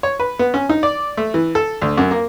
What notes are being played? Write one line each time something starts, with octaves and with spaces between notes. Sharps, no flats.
C#5
B4
B3
C#4
D#4
D5
A3
E3
A4
D2
F#2
A#3